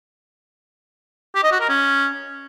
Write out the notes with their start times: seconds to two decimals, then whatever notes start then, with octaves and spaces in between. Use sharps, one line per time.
1.35 G4
1.43 D#5
1.52 F#4
1.61 A#4
1.69 C#4